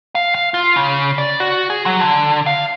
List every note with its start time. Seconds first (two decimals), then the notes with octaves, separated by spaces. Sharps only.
0.15 F5
0.35 F5
0.54 F4
0.76 C#3
1.18 D5
1.40 F#4
1.70 G#4
1.86 F#3
2.00 D3
2.46 F5